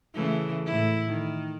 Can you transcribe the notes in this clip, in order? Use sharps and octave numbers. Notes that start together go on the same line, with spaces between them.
C#3 E3 A3
A2 E4
D#3